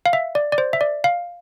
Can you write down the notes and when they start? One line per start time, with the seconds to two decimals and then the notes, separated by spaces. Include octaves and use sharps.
0.06 F5
0.13 E5
0.35 D5
0.52 D5
0.58 C5
0.73 E5
0.81 D5
1.04 F5